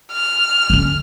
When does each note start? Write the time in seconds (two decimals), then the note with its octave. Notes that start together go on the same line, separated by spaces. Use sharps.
0.12 F6
0.70 D3 C#4